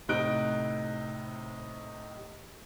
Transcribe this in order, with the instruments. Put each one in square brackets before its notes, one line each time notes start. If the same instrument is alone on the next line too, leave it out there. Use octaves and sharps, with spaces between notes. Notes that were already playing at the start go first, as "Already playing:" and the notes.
[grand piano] A2 C3 D#4 F#6 D7